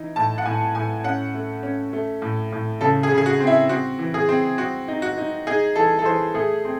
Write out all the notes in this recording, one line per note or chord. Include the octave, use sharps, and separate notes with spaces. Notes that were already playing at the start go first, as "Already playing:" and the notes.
Already playing: E3 D#4
A2 A5
F#5
A2 G#5
A2 G#5
C#4 F#5
A3
C#4
A3
A2
A2
C#3 A4
G#4
C#3
G#4
F#4
C4
E4
C4 F#4
E3
G#4
C4
C4 F#4
D#4
F#4
D#4
D#4 G#4
E3 A4
A4
E3 C5
A3 G#4
C4